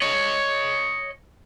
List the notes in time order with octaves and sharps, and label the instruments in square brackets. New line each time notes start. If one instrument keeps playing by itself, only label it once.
[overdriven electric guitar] C#5 D#5